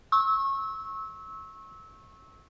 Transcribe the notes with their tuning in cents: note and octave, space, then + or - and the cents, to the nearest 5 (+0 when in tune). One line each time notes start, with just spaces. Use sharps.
C#6 -25 E6 -20